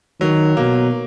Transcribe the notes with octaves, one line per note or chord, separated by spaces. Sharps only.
D#3 F#3
B2 A#3